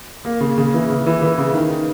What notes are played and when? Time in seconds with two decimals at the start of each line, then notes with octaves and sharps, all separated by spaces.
0.25 A#3
0.41 C#3
0.58 C#3
0.74 E3
0.90 C#3
1.06 E3
1.22 E3
1.38 C#3
1.54 D#3